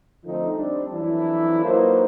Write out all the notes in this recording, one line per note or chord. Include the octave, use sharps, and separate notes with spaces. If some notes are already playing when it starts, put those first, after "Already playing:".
D3 F3 A3 C4 D#4
G3 C4 D4
F2 E3 F#3 D4 E4
F#3 A#3 D#4 F4 B4 C5